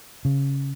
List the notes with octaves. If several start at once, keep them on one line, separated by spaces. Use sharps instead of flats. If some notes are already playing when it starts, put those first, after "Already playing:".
C#3